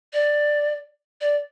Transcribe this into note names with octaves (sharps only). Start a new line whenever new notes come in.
D5
D5